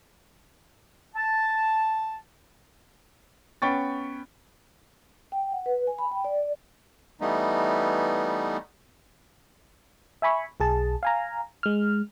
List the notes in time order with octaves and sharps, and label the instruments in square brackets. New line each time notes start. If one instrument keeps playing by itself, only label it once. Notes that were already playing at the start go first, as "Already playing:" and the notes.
[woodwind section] A5
[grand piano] B3 C#4 G5 C#6 A6
[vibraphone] G5
F#5
B4
G#5
B5
G5
D5
[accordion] E3 G3 A3 B3 D#4
[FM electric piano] E5 G#5 B5 C#6
B1 G#4 A5
F5 G#5 A#5
G#3 F6